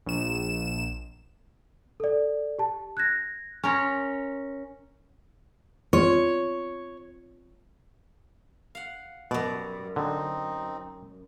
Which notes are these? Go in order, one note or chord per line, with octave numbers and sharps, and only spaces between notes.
A#1 E7
A4 D5
G4 A5
F#6 G#6 A#6
C#4 A#4 C#5 G#5 C6
C4 F4 C#5
F5 F#5
F#2 B2 G3 D5
D3 C4 D#4